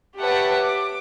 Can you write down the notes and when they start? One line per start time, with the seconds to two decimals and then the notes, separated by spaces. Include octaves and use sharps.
0.18 G4 B4 C#5 E5 F#5 A5
0.62 D6